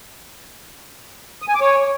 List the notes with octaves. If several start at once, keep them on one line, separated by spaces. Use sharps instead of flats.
D#6
G#5
D6
C#5